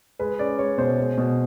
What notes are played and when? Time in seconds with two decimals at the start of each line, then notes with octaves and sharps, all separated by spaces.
0.19 G#3 B4
0.39 C#4 D5
0.58 G#3 C#5
0.78 B2 C5
0.98 G#3
1.18 B2